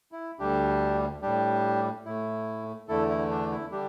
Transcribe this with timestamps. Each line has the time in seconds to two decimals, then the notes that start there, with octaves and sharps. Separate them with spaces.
0.12 E4
0.39 D2 D3 G3 D4 G4
1.22 A2 G3 D4 G4
2.05 A2 A3 E4
2.88 E2 D3 A3 E4 A4
3.09 E4
3.30 D4
3.51 E4
3.71 D3 G3 D4 G4